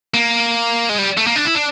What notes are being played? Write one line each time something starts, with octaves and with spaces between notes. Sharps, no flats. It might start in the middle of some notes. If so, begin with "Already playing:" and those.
A#3
G#3
G3
A3
A#3
D4
E4
D4